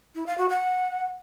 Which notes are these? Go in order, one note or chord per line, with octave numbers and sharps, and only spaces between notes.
E4
F5
F#4
F#5